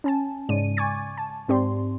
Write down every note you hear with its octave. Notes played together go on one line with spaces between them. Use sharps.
C#4 G#5 A5
G#2 C#3 G#3 D5 D#7
G#5 C#6 D6 G#6 A6
A5
G#2 C4 G4 D5 C6